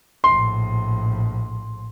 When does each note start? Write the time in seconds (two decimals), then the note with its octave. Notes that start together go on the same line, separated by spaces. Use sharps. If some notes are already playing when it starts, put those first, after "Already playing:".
0.24 A#1 A2 C6